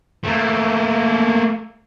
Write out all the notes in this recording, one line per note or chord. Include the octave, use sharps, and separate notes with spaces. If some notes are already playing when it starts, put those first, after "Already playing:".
A3 A#3